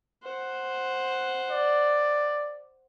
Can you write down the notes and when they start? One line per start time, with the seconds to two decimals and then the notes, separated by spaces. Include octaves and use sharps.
0.23 C5 F#5
1.50 D5